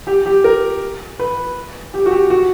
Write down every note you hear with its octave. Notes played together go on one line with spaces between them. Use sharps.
G4
G4
A#4
B4
G4
F#4
G4
F#4